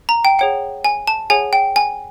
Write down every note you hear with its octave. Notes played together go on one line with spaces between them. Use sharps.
A#5
G5
G#4 C#5 F#5 G5
G#5
A5
G#4 C#5 F#5 G#5
G5
G#5